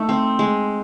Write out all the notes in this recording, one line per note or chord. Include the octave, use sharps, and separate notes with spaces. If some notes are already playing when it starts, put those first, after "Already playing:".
Already playing: A3 D#4
C4
G#3